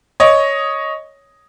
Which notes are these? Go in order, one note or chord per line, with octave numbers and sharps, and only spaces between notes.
C#5 D#5